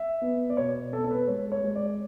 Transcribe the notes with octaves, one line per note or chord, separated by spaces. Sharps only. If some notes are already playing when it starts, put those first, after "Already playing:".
Already playing: E5
B3
D5
B2 C#5
B3 A4
A4
B4
G#3 C#5
C#5
G#3
D5